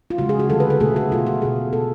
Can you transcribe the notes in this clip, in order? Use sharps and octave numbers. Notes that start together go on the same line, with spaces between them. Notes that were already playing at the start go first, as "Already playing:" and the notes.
F4
C#3 G#3 F#4
G#4
F#4
D3 F#3 A3 A4
B4
A4
B2 A3 G#4
F#4
B2 A3 F4
F#4
B2 A3 G#4
B2 A3 A4